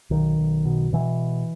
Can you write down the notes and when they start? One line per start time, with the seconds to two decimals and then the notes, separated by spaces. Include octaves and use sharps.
0.10 B1 D#3
0.38 B1
0.65 B2
0.93 B2 E3